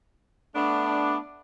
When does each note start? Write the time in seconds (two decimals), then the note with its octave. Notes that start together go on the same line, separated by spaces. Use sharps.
0.55 A3 B3 D4